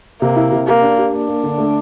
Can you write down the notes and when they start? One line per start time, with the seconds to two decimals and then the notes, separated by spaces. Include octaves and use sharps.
0.22 C3 A#3
0.36 E4
0.52 C3
0.67 A#3 G4
0.82 D4
0.98 G4
1.13 A#3 D4
1.28 A#3
1.43 D3
1.58 A3